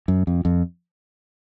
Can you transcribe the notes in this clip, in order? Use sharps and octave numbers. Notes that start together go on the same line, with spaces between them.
F#2
F2
F2